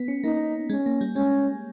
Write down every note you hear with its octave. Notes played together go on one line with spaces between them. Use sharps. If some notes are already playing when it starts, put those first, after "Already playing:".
Already playing: B3
C#4
A#3 D#4
G#3 C#4
A#3
G3
G#3 C#4